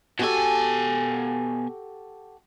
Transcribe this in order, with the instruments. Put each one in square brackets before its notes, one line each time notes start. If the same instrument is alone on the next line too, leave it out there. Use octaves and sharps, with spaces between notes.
[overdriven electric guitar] B2 G#5 [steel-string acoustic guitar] F#4 G4 A4